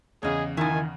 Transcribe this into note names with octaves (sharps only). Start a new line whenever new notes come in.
E2 C#3 G#4 C#5 D#5
D#3 F3 E4 G#5